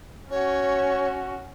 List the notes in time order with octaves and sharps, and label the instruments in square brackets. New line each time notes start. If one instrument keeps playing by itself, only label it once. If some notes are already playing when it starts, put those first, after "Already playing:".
[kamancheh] C#4 F#4 [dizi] C#5